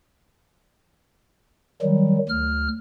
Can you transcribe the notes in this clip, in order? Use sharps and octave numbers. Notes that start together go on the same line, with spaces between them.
D#3 F#3 G3
D2 F6